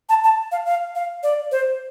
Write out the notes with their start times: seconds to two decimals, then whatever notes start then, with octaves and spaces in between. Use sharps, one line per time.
0.09 A5
0.24 A5
0.52 F5
0.66 F5
0.95 F5
1.23 D5
1.52 C5